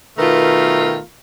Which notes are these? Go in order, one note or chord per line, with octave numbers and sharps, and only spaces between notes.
B2 D#3 A3 B3 F4 A#4